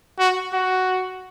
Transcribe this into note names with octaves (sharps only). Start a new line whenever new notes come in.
F#4
F#4